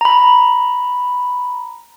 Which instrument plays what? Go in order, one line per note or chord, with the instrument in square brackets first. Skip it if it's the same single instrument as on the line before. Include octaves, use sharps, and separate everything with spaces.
[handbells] A#5 B5